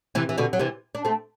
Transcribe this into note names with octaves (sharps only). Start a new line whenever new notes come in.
C3 E3
E3
B2 D3
F#3
C3 E3
D4
A3 C4